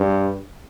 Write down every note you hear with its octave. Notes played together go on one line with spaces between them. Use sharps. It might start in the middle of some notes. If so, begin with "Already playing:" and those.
Already playing: G2